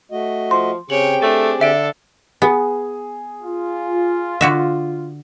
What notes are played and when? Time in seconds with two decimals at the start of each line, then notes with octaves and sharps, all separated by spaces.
0.11 A3 F#4 D#5
0.51 F3 C6
0.90 C#3 C4 G4 G#4 C#5 G5 F#7
1.22 A3 D4 A6
1.61 D3 A4 E5 D7
2.42 B3 G#4
3.43 F4
4.41 D3 F#4 E5